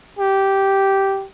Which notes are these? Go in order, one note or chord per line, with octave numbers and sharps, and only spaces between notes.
G4